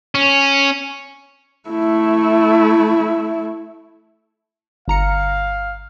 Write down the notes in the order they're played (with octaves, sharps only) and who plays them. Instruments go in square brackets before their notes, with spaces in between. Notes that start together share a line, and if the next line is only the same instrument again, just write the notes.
[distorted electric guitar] C#4
[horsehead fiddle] A3 E4
[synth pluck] G1 A#5 C#7 [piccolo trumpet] F5